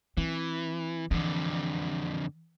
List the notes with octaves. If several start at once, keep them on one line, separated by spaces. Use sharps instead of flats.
E3 C4
F2 D3 E3